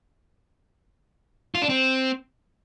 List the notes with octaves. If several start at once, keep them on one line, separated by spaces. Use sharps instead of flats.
F4
D4
C4